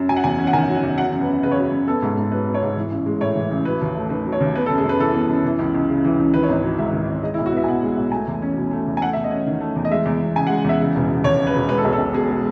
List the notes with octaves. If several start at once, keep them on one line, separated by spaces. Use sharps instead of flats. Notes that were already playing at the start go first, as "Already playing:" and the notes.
Already playing: F#2
F#3 G#5
F#5
E2 G#5
C#4
F#5
D#3 G#5
F#3
E2
F#3 F#5
F#2
B4
C#4
C#3 B4
C#5
F#3 B4
F#2
B3 A4
G#2
G#2
F#3 B4
B3
C#5
G#2
E3
A1
G#3
A2 C#5
E3
A1
F#3 B4
D#2
A3
D#3 B4
F#3
C#5
D#2
B3 B4
A4
F#2
G#4
F#2 B4
E3 A4
B3
F#2
E3
C#2
C#2
C#3
E3
C#2
D#3 B4
C#5
G#1 B4
F#3
G#2 E5
D#3
G#1
G#3 D#5
E4
B1
F#4
B3 E5
G#5
B2 F#5
G#3
B1
A3 G#5
E2
C#4
B2
A3
E2
G#5
A3 F#5
E5
E2
D#5
C#4
D#3
A3
E2
D#5
G#3 E5
E2
E2
C#3 G#5
F#5
G#3
E2 E5
C#3
E1
E1
D#2 C#5
C#3
B4
E1
G#3 B4
A4
B1 G#4
A4
B1
B2 G#4
G#3